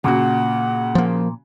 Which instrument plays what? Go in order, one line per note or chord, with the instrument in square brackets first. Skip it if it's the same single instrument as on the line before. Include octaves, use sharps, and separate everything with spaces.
[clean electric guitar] A#2 [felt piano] C#3 F#4 [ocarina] F#5
[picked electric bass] F3 A#3